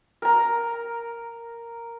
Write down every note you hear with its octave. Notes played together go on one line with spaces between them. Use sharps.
A#4 A#5